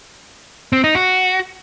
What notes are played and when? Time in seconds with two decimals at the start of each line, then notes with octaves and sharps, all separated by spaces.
0.73 C4
0.84 D#4
0.95 F#4